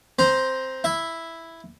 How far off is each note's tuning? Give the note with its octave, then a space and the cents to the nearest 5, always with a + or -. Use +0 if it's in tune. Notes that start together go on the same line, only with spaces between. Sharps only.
C4 +0 C5 +0 A#5 +20
E4 +0 E5 +0